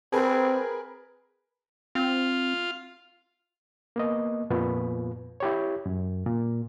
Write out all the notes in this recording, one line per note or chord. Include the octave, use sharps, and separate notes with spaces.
C4 G#4 A#4 B4
C4 F4
A#3 B3 D#5
F2 A#2 B3 F4 B4
E4 G4 C#5
F#2
A#2